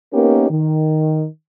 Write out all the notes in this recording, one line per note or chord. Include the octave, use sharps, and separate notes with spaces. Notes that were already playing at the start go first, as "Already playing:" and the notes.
A#3 B3 C#4 D#4 G4 A#4
D#3